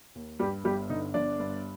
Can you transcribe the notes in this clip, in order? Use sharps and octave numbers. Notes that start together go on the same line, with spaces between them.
D#2
G2 G3 G4
G1 G3 G4
D3 D#4
G1 D4 D5
G2